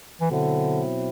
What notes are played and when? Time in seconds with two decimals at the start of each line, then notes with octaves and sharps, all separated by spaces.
0.21 E3
0.30 B2 D3 F#3 C4 E4